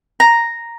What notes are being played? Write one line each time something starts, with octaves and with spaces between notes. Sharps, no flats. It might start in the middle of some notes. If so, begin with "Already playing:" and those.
A#5